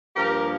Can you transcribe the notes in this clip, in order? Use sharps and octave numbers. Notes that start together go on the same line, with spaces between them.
G2 F3 A#3 G4 A#4